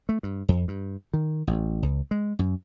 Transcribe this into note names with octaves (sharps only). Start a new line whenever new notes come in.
A3
G2
F2
G2
D#3
A1
C#2
G#3
F#2